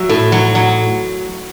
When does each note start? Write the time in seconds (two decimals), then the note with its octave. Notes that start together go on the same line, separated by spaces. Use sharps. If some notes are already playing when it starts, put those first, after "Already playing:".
Already playing: F#3 E5
0.09 A2
0.32 F#3
0.55 F#3